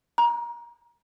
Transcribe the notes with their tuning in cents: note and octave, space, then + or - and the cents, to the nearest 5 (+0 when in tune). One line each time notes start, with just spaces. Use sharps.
A#5 +25